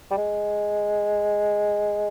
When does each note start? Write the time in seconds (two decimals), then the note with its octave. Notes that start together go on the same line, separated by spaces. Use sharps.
0.11 G3
0.17 G#3